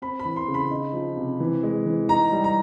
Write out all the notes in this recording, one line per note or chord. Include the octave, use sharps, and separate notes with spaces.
C4 B5
B5
E3
C6
C#3
B5
D#4
F3
C3
E3
G#3
E3
D#4 A#5
G3
A#5